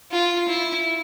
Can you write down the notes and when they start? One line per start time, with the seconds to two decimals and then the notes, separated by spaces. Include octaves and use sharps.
0.11 F4
0.49 E4